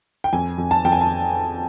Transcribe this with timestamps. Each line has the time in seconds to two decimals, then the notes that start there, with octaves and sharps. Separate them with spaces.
0.24 G5
0.33 F2 G#5
0.58 F2
0.71 A5
0.85 F2 G5
0.92 G#5
1.01 A5